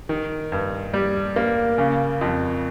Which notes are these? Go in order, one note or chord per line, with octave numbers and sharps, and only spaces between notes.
D#3
G2
G3
A#3
C#3
F2